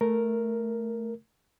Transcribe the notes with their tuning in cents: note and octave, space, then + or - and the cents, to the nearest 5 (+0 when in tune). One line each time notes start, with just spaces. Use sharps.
A3 +0 A#4 +0